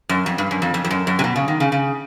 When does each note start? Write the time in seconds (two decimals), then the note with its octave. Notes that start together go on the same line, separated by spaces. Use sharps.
0.09 F#2
0.26 F2
0.38 G2
0.51 F#2
0.62 F2
0.74 F2
0.85 F2
0.91 F#2
1.07 F#2
1.19 C3
1.24 B2
1.36 C#3
1.48 D#3
1.60 C#3
1.72 C#3